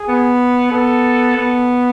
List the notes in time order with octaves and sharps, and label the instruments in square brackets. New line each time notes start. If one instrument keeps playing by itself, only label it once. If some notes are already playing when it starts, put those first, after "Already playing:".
Already playing: [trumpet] G#4
[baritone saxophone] B3
[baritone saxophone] B3 [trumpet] A4
[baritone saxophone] B3